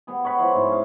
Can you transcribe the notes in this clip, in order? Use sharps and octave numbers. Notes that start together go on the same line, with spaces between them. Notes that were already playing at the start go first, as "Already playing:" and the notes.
G3 B3 G#4
C#5 F#5 B5
F3 E4 C#5 C6
G#2 B2
C#4 F5